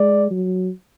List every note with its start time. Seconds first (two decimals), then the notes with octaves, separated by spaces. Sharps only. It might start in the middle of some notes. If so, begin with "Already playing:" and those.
Already playing: G#3 D5
0.31 F#3